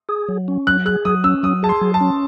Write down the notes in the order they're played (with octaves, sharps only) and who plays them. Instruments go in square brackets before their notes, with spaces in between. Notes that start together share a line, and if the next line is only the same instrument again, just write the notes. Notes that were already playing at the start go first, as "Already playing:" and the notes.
[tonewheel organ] G#4
F#3
C#4
[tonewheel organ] F#3 [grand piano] F#6
[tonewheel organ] G#4 [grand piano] F#6
[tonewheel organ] F#3 [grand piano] D#6
[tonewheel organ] C#4 [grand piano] E6
[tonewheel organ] F#3 [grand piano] D#6
[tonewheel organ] G#4 [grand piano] A5
[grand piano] C6
[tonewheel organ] F#3
[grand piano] A5
[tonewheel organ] C#4